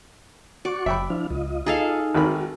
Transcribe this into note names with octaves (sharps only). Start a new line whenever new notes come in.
F#4 D5 C#6
F#1 E5 G5 B5
F3 D4 E4 F5
C#2 F4 D#5
D#4 G#4 A4 F5
G#1 D#3 F#4 B5